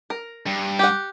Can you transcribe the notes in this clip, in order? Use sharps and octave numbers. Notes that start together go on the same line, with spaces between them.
A#4
G2
G4 F#5